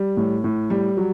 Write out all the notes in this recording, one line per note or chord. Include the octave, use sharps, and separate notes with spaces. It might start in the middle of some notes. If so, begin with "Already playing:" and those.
Already playing: G3
A2
A2
G3
F#3